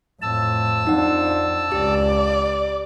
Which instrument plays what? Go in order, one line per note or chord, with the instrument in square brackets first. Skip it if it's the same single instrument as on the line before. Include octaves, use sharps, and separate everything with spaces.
[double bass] F2 A2 [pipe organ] A5 E6
[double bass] F2 D4 [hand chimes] D#4 F#5
[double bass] C#2 [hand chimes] G4 [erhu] D5